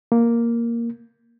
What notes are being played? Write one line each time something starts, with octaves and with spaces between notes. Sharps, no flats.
A#3